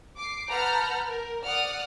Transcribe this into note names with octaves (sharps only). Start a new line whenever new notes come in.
D6 C7
B4 F#5 A5 A#5 F6 G6
A#4
D5 F#5 D#6 F6